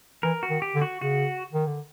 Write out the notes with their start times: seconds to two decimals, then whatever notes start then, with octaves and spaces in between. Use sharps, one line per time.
0.23 E3 A#4
0.43 F#4
0.50 D#3
0.62 G4
0.75 D3
0.82 F#4
1.01 C#3 F#4
1.53 D#3
1.67 D3